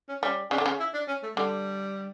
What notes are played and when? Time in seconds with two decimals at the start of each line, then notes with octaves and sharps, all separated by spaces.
0.09 C#4
0.22 G3 C#4
0.51 C#3 D4
0.58 D3
0.66 C#3
0.80 E4
0.94 D4
1.08 C#4
1.23 A3
1.37 D3 G3